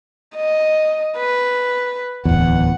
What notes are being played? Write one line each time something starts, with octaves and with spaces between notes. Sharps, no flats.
D#5
B4
D1 E2 F#5